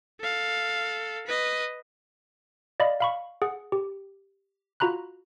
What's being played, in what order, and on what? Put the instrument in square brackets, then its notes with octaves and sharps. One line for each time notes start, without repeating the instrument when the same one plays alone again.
[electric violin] A4 F5
B4 D#5
[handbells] D5 D#5 F5 B5
F5 B5 C#6
G#4 F#5
G4
F4 F#4 A#5 B5 F#6